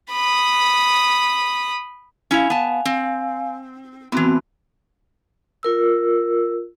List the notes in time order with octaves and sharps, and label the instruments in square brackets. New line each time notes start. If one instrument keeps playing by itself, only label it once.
[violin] B5 D#6
[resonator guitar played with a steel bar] C#4 E4 [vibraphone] F5 G#5
[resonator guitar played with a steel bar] B3 A5
C4
[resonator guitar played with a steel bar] A2 E3 [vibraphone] B3 C4 F#4
[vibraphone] F4 A#4 E6